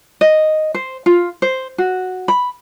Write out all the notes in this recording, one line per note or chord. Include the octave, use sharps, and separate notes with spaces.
D#5
C5
F4
C5
F#4
B5